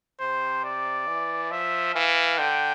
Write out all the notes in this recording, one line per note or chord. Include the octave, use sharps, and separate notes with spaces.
C3 C5
D5
E3
F3 E5
E3 F5
D3 G5